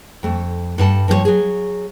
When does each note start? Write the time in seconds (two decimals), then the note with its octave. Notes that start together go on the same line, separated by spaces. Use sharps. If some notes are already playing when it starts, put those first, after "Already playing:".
0.23 F2 A3
0.78 G2 F#5 A5
1.08 G2 F3 G#4 C#5
1.25 F#3 G#4